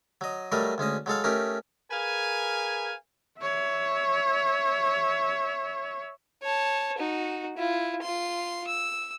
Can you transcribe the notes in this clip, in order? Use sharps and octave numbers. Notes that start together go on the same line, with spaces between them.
F#3 D#5
F#3 G3 A3 A#4 D#5
D2 G#3 C#4 D#5
F#3 G#3 A4 F5
A3 C#4 D#4 G4 A#4
G#4 A#4 B4 F5 G#5
C#5 E5
C#5 A5
D#4 F#4
E4 F4
F4 C6
E6